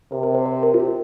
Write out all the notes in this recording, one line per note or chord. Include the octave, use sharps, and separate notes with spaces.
C3 A#4
A#4
C5
C5
A#4
F4
G4